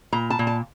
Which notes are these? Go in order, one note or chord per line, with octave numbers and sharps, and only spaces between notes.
A#2 A#5
A5
A#2
A5